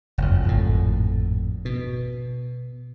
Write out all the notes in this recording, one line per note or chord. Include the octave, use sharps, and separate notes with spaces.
F#1 F2
G#1 F2 A2
B2